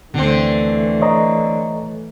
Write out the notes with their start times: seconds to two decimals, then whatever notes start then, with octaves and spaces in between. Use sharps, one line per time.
0.14 D2 B2 D3 E3 A3 C4
1.02 C#5 D#5 A#5